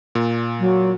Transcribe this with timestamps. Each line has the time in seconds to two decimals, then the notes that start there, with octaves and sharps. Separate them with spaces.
0.15 A#2
0.59 F#3